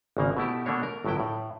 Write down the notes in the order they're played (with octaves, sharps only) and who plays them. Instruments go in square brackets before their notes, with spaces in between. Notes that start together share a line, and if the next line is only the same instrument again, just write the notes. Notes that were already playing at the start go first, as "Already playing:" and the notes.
[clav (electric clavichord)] G#1 C#3 A#3
B2 A3 E4 G4
B2 A3 A#3 D4 C#5
A#4
G1 A2 F#3 E4 G5
A2